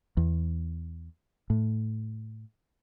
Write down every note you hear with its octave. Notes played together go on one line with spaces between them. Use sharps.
E2
A2